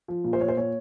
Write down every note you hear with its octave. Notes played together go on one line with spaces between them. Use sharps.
F3
A#2
C5
A#2 C#5
C5
A#2 C#5